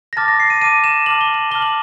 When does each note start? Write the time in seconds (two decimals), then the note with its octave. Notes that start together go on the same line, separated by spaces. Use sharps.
0.13 A#6
0.17 A5 D6 F6 A6
0.28 A#6
0.40 C7
0.50 D#7
0.62 A5 D6 F6 D#7
0.84 E7
1.06 A5 D6 F6 F#7
1.21 G7
1.34 F#7
1.51 A5 D6 F6 G7
1.62 F#7